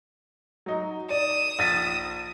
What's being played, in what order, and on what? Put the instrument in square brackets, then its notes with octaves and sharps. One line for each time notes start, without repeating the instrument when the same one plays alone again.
[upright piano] F#3 D#4
[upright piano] D5 [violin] D#6 E7
[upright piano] A#1 A6 B6